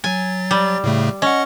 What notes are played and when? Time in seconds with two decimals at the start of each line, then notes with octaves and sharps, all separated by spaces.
0.04 F#3 G#5 A6
0.51 G3
0.84 A2 C#3 A3
1.22 C#4 D#5 F#5